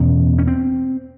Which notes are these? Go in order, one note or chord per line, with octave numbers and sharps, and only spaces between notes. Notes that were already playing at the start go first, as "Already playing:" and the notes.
Already playing: E2 B2 C#4
C#4
C4